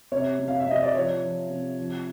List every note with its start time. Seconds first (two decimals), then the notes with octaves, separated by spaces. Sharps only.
0.12 C3 C#5
0.39 C3
0.48 F5
0.60 E5
0.67 C3 D#5
0.83 D5
0.95 F3 C#5
1.22 F3
1.50 C3
1.78 F3